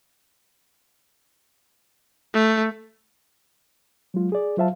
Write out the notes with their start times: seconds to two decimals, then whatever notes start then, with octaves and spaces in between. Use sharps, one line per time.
2.34 A3
4.14 F#3 G#3 F4
4.32 G#4 D5
4.57 F#3 F4 C5 E5 F5 A5